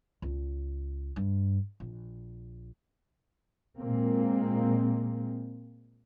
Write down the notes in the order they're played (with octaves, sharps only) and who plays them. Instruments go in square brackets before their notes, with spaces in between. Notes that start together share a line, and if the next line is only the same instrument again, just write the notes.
[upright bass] C#2
G2
A#1
[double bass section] A#2 G#3 A#3 C4